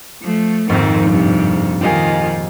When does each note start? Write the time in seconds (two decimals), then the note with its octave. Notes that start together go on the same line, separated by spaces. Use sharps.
0.21 F3 A3
0.69 A#1 F2 G#2 D#3 C4
1.10 G2 C3
1.81 D#3 F4 G4 D#5 G#5